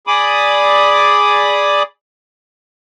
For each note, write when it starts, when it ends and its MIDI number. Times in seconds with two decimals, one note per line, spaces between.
0.07 1.83 68
0.07 1.83 74
0.07 1.83 83
0.07 1.83 86
0.07 1.83 87